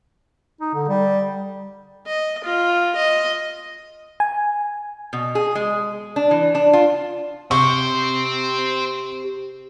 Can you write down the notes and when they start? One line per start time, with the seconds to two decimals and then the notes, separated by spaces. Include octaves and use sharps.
0.61 D#4
0.74 D3
0.89 G3
2.06 D#5
2.44 F4
2.96 D#5
4.20 G#5
5.13 B2
5.35 G#4
5.55 G#3
6.16 D4
6.31 E3
6.55 D4
6.73 F4
7.51 C3 C4 C5 C#6